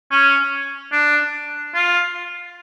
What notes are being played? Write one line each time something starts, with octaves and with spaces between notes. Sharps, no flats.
C#4
D4
F4